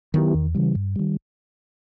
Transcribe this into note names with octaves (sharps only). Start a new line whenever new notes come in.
D#3 F#3 B3 E4 G4
E2
C#3 E3 G3
G2
D#3 G3